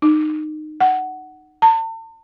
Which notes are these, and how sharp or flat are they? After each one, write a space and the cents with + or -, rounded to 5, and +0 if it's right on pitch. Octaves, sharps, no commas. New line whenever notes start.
D#4 -20
F#5 +10
A5 +40